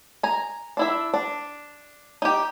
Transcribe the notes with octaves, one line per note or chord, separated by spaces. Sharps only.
G#5 A#5
D4 E4 E5
D4
D#4 G4